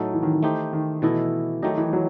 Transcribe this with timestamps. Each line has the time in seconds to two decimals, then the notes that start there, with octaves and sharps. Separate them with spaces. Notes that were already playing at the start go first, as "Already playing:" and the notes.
Already playing: A2 F#3 A3 D#4 A4
0.13 E3
0.23 D#3
0.33 D#3
0.43 A3 D#4 G4 C5
0.73 D#3
1.02 B2 E3 A3 E4 A4 D#5
1.63 D#3 F#3 A3 D#4 G4 D#5
1.78 E3
1.93 F#3